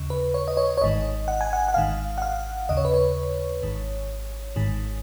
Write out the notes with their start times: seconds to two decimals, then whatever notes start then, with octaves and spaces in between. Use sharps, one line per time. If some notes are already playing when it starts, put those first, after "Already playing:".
Already playing: D#2 C#3
0.10 B4
0.34 C#5
0.48 D#5
0.57 C#5
0.77 C#5
0.82 G#1 G#2 D#3 D#5
1.28 F#5
1.41 G#5
1.53 F#5
1.68 F#5
1.74 G#1 G#2 D#3 F5
2.18 F#5
2.22 F5
2.69 D#2 C#3 D#5
2.77 C#5
2.85 B4
2.94 C#5
3.63 G#1 G#2 D#3
4.56 G#1 G#2 D#3